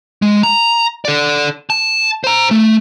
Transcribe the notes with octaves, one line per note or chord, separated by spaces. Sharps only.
G#3
A#5
A4 D5
A5
C5 A#5
A3